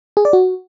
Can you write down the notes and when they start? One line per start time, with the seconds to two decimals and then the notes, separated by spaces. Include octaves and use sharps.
0.17 G#4
0.25 D5
0.33 F#4